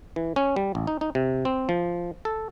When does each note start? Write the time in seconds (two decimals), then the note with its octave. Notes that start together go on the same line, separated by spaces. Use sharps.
0.16 E3
0.36 C#4
0.56 G3
0.75 A1
0.87 D#4
1.01 D#4
1.15 C3
1.45 C4
1.69 F3
2.25 A4